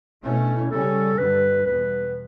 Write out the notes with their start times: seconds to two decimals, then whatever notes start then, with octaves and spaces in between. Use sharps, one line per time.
0.23 B2 A3 C#4 E4
0.39 D4
0.55 E4
0.71 C#3 G3 C#4 A4
1.18 G2 D3 G3 B4
1.66 E2 B2 G3 B3 B4